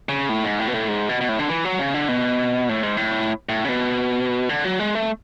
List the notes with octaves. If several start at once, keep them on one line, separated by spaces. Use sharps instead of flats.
C#3
A2
G#2
A2
B2
A2
G#2
B2
B2
A2
D3
E3
F#3
C#3
D3
B2
A2
G#2
A2
A2
C#3
B2
D3
F#3
G#3
A3